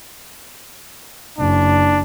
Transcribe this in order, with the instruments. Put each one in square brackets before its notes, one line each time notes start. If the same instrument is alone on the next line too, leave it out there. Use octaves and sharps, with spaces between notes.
[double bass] F#1 [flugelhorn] D4